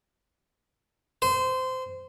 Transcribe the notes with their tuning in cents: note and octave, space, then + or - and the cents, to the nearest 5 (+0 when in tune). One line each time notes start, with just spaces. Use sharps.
C5 -20